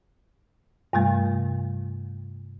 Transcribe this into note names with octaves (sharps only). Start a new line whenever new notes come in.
G2 C3 G3 A3